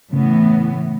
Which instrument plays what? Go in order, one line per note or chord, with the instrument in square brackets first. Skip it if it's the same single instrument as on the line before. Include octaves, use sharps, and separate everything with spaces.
[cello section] A2 E3 B3 [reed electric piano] C#3